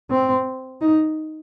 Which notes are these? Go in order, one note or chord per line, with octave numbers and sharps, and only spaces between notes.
C4
D#4